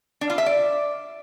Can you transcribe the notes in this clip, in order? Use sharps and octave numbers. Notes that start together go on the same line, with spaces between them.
D4
F4
E5
D5